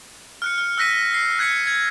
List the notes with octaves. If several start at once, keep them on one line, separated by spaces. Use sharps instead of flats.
F6 F#6 C#7
F6
E6 F#6 A#6 B6 D#7
C7
F#6 G#6 B6 C#7
G#6